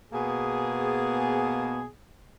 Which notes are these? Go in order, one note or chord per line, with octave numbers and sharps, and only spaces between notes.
B2 A#3 B3 G#4